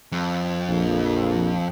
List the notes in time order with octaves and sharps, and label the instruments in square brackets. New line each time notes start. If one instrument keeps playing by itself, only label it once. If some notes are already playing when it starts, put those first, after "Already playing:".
[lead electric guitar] F2
[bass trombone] A#1